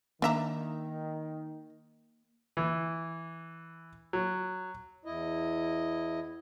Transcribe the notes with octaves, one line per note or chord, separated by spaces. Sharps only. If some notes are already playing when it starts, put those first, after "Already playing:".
D#3 A#3 D4 E5 A#5
E3
F#3
E2 E4 D#5